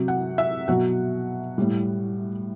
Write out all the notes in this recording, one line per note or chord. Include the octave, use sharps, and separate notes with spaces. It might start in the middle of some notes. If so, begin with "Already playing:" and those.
Already playing: C3 F#3
F#5
E5
B2 F#3 F#5
A2 G3